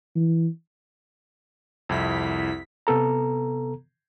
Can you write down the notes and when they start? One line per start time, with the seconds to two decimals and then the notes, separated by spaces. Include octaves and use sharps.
0.16 E3
1.89 C2 F2 E4 B6
2.87 C3 B3 A4 A#5